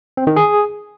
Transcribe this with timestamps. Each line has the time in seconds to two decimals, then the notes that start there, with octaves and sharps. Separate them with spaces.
0.17 C4
0.27 D#3
0.36 G#4